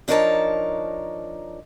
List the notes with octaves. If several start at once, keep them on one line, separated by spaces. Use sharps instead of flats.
F3 D4 D#4 A#4 C#5 A5